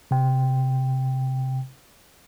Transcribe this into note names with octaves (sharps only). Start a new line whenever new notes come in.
C3 G5